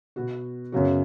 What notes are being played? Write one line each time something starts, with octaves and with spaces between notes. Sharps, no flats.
B2 B3 F#4
F#2 C#3 F#3 B3 F#4